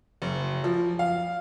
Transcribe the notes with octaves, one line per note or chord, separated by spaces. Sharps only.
F#1
F3
F5